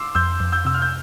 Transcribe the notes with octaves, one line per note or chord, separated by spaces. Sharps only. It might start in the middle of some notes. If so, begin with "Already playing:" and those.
Already playing: C6 D6 E6
F2 E6 G6
F2
E6 G6
C3 E6
F6
G6